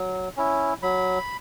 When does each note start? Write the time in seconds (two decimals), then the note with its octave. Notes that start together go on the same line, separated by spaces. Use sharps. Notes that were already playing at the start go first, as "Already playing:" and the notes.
Already playing: F#3
0.37 C#4 E4
0.83 F#3 B5